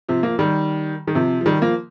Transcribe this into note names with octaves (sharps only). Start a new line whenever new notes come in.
C3 F3
F3 A#3
D#3 G3
D#3
C3 F3
F3
D#3 G3
F3 A#3